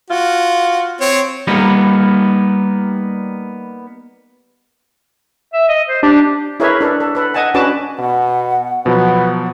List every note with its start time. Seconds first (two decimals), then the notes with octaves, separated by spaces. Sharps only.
0.10 F4 F#4
1.00 C4 C#5
1.47 G3 A#3 B3 D#4
5.53 E5
5.68 D#5
5.89 C5
6.03 D4 G4
6.60 E4 G#4 A#4 B4 C#5 E5
6.81 D4 A4 B4
7.00 A4
7.15 A4 B4
7.34 D#5 F#5 G#5 A5
7.54 C#4 D4 F#4 B4 A5 D6
7.99 B2 F#5
8.86 B2 F3 F#3 B3